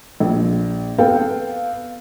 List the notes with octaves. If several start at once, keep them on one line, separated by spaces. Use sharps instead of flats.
A#1
B3 A4 F5 G5